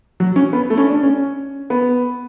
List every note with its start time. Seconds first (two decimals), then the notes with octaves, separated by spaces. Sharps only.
0.20 F#3
0.36 C#4
0.53 B3
0.70 A3
0.78 C#4
0.87 D4
1.03 C#4
1.70 B3